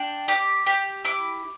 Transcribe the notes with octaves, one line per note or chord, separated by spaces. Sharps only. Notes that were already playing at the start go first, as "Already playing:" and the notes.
Already playing: D4 G5
G4 D6
G4
E4 D6